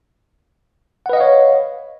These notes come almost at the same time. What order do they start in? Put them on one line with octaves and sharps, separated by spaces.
F#5 B4 D#5 F5 C#5